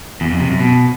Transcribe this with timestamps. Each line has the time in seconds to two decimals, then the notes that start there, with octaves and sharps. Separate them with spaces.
0.21 E2
0.31 F2
0.40 C3
0.50 F#2
0.60 B2